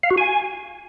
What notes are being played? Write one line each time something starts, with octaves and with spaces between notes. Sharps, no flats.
F5
F#4
G#5